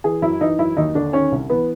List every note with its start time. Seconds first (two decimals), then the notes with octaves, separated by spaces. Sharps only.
0.04 E3 G#4
0.22 F#2 E4
0.41 E3 D#4
0.59 F#2 E4
0.77 D#2 D#4
0.95 D3 D4
1.13 D#3 C#4
1.32 C2
1.50 E3 B3